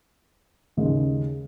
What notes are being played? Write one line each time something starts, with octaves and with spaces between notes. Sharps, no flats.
D#2 C#3 G#3